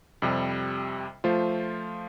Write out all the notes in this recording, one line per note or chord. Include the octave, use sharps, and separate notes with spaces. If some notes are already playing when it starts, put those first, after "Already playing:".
F2 C3 G3
F3 A3 F4 C5